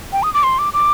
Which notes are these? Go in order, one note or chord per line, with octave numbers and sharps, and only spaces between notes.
G5
D#6
D6
C6
D6
D6